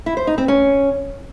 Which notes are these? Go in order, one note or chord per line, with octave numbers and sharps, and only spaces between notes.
E4
C5
D#4
C4
C#4